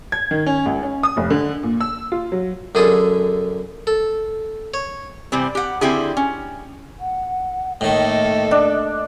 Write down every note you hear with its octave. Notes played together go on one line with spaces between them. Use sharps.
G#6
D#3
C#4
C#2
C#4
D#6
F1
D3
A#2
E6
F4
F#3
F#2 D3 G#4 A4
A4
C#5
C3 E3 G3 C4
G4 F#5
D3 C4 E4 G4 G#4
C#4
F#5
A2 D#3 A3 A#3 A4 D#5
D4